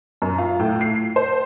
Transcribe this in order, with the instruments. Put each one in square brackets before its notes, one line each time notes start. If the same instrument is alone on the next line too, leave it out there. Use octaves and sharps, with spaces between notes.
[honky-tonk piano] F#2
F4
A2
C7
C5